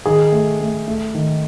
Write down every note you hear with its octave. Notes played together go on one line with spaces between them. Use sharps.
D#3 G#4
A3
A3
A3
D#3